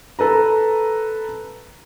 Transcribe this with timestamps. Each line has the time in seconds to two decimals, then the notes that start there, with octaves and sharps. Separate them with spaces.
0.19 A4 B4 A#5